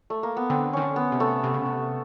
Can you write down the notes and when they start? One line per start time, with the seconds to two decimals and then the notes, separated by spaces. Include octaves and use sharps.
0.10 A3
0.23 A#3
0.37 B3
0.50 D3 C4
0.73 D#3 C#4
0.82 D3
0.96 B3
1.12 C3
1.20 A3
1.44 C3
1.54 C#3
1.66 C3